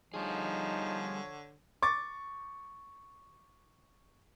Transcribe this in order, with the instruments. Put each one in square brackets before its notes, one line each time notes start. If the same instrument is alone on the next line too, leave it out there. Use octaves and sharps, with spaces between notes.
[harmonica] D3 C#5 [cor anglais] F3 [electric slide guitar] G3 G#4 [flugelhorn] D#4
[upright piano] C#6 D6 A6